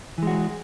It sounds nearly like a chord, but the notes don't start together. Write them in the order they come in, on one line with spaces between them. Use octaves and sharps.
E3 G#3 F#4